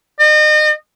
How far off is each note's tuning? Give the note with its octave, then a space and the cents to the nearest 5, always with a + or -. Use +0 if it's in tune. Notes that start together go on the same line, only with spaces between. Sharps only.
D#5 -35